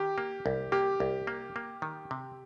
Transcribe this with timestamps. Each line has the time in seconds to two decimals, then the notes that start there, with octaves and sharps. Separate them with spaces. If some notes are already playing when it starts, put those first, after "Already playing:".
Already playing: D#3 G4
0.18 A#3
0.46 C2
0.72 A#3 G4
1.00 C2
1.27 A#3
1.56 A#3
1.82 D#3
2.11 C3